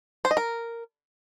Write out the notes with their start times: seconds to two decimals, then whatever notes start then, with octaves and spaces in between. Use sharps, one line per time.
0.25 C5
0.31 D#5
0.37 A#4